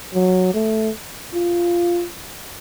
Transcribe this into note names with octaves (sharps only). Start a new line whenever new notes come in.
F#3
A3
F4